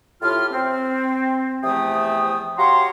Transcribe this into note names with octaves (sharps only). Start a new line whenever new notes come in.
A2 F4 G4 F6
C4
E2 C3 F3 A3 G5 D#6
F#4 G4 C#5 F5 A#5 C6